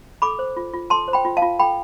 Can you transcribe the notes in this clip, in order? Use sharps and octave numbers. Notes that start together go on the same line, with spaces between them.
A4 B5 D6
C5
F4
F4
A4 A5 C6
C5
G5 B5
F4
F5 A5
F4
A4 G5 B5